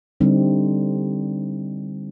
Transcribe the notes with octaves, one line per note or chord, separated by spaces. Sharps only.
D3 G3 C4 D#4